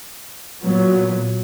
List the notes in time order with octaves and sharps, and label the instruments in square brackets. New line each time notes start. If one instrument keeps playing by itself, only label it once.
[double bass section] A#2 F#3 B3